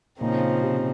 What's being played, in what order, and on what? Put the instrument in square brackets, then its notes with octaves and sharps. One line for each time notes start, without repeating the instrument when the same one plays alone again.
[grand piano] A#2 [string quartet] C#3 F3 C4 D#4
[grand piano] C3